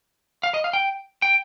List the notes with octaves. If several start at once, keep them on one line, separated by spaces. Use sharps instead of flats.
F5
D#5
F5
G5
G5